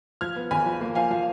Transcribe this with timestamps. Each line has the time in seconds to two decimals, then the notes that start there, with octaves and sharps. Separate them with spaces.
0.21 F3 F6 G#6
0.36 B3
0.51 G#1 G#5 B5
0.66 F3
0.81 A#3
0.95 F3 F5 G#5
1.11 F3 F5